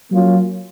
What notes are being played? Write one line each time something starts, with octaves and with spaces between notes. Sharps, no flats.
F#3 A#3 C#4 F4